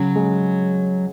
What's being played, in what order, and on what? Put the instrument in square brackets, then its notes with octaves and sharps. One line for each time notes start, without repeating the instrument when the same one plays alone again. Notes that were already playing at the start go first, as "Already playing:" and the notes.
Already playing: [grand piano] C#3 [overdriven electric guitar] F#3
[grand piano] G#3